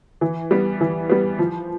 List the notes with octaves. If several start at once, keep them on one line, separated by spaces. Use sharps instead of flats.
E3
G3 B3
E3
G3 B3
F3